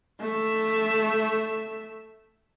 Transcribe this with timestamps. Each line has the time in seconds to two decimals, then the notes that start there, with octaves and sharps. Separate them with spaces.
0.20 A3 E5